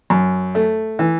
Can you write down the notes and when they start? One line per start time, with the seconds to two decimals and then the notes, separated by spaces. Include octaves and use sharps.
0.10 F#2
0.55 A3
0.99 E3